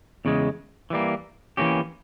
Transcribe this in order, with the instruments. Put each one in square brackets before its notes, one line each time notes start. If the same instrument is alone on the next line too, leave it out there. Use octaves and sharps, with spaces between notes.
[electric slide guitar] E2 C#3 G#3
E3 G3 A#3
E3 A#3 C#4 G4